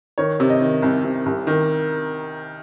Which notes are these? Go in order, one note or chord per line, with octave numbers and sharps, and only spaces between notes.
D#3 C#5
C3
D#5
D#3
C2
C3
C2
D#3